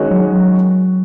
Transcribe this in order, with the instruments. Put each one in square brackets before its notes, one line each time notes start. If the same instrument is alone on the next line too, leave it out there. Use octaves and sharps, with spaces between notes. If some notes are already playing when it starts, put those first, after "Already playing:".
Already playing: [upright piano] D#3 G#3 C#4 F#4
[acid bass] F#3